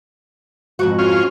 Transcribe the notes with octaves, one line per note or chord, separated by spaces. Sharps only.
F2 G#2 F#4
C#4 F4